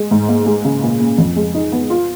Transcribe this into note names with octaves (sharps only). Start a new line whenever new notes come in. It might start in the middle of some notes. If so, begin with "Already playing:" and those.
Already playing: G#3
G#2
A#3
G#3
C#3
A#2
A#3
F2
G#3
D#4
B3
F4